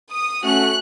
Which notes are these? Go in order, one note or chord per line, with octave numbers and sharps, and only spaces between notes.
D#6
A3 C#4 F#4 F#6